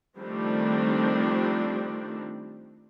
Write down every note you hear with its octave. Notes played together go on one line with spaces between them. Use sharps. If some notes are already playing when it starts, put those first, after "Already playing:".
D#3 F3 G3 A3 C4 D4